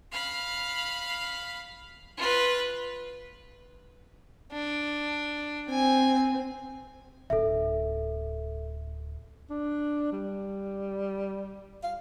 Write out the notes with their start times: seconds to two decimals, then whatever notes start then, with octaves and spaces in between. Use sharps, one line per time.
0.12 F5 B5
2.17 F4 B4
4.52 D4
5.70 C4 G#5
7.30 D1 D#4 A4 E5
9.50 D4
10.12 G3
11.83 F5